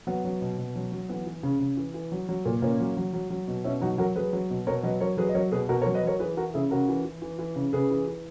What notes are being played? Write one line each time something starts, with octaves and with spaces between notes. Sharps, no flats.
F#3 B3
F#3
B2
B2
F#3
F#3
E3 B3
E3
C#3
C#3
E3
E3
F#3
F#3
A#2
A#2 A#3 C#4
F#3
F#3
F#3
F#3
B2
B2 C#4 E4
F#3 D#4 F#4
F#3 F#4 A#4
F#3 G#4 B4
F#3
B2
B2 A#4 C#5
F#3 B4 D#5
F#3 A#4 C#5
F#3 G#4 B4
D#5
F#3 A#4 C#5
B2 G#4 B4
B2 F#4 A#4
A#4 C#5
F#3
B4 D#5
F#3 A#4 C#5
E3 G#4 B4
E3 F#4 A#4
C#3 E4 G#4
C#3 F#4 A#4
E3
E3
E3
E3
C#3
C#3 G#4 B4
E3
E3